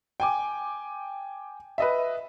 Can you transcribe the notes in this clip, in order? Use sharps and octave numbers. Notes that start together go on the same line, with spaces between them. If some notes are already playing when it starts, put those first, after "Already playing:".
G5 G#5 D6
B4 D#5 E5